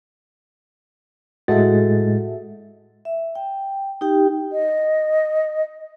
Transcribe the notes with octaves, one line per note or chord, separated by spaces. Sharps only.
A2 G#3 F#4 A4 E5 A6
E5
G5
D#4 G4 G5
D#5